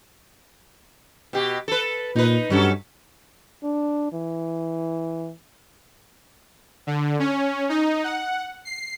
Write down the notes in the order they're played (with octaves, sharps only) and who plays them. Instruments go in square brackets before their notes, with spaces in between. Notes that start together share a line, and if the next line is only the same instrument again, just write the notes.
[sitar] B2 G4
A4 B4
[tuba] A#2 [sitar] D#4 B4
[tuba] G2 [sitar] F#3 C#4 A4
[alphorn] D4
E3
[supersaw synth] D3
C#4
D#4
F#5
C7